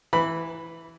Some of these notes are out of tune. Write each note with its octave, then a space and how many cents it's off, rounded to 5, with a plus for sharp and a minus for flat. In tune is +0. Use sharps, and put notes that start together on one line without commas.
E3 +0 B5 +0